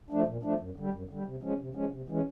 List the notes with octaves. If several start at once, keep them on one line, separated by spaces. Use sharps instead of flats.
F3 A3 D4
A#2
F3 A3 D4
F#2
D3 G3
F#2
D3 G3
C3
F3 G#3 C#4
C3
F3 G#3 C#4
C3
E3 G#3 C#4